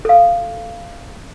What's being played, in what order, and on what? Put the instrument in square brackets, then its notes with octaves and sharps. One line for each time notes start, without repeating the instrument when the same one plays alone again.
[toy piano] A4 F5